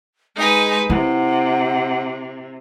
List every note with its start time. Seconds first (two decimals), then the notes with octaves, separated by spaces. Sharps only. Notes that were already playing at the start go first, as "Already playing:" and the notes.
0.37 G#3 D#4 B4 G#5
0.90 C3 E4 F#5